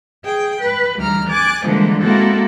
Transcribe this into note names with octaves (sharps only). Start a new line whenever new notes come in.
G#4 G5
B4
D2 E3 G3 A#5 F6
G#5 D6 F#6 A6
D3 E3 F3 G3 G#3 A#3
G#3 A#3 C4 E4 F#4 A4